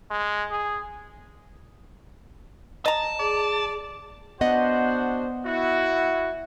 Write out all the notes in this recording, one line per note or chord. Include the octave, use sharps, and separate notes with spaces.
G#3
G#4
D#5 A5 A#5
G#4 D5
B3 D4 F#4 C5 D#5 F#5
E4 F#4